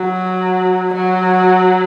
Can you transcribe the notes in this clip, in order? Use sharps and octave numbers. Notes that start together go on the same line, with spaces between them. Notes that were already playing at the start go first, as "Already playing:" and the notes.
Already playing: F#3
F#3